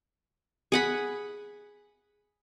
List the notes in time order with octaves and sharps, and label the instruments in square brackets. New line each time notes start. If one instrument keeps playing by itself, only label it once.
[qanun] G#4 F#5 B5